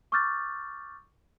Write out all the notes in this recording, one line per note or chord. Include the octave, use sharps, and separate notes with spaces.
C#6 D6 E6 F6 G6 A6